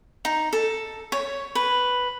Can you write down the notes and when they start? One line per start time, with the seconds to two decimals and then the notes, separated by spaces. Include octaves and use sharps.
0.25 D#4
0.53 A4
1.12 C#5
1.55 B4